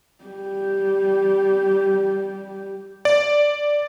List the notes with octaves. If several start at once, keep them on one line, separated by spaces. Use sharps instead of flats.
G3 G4
D5